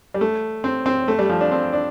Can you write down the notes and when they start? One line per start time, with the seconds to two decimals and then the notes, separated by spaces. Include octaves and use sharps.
0.14 G3
0.21 A3
0.64 C4
0.86 C4
1.08 A3
1.19 G3
1.30 F3
1.41 D4
1.52 C4
1.73 D4